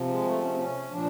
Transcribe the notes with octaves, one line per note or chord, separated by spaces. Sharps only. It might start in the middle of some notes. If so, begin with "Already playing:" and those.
Already playing: C3 F3
G#3
A3
C#4
C4
C#4
A#2 F3 D4